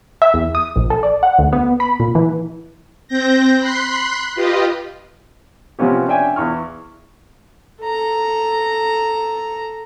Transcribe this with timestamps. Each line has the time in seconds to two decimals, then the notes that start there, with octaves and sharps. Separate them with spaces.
0.22 E5
0.34 E2
0.55 D#6
0.76 A#1
0.90 A4
1.03 D5
1.23 F#5
1.39 D2
1.53 B3
1.80 B5
2.00 A#2
2.15 E3
3.08 C4 G6 A#6
3.59 B5 C6 F#6 C7
4.35 F4 G4 B4 D#5
5.79 C3 F3 B3 C#4 G4
6.08 C#4 D4 E5 G5 G#5
6.36 E2 C#6 F6
7.81 A4 A#5